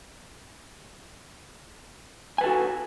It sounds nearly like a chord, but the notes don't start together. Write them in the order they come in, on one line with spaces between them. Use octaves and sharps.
G#5 B4 A4 F#4